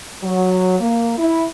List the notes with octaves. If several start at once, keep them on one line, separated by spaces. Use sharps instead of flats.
F#3
A#3
E4